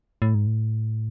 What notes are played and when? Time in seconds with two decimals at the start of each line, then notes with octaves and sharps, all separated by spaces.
0.22 A2
0.35 G#2
0.47 A2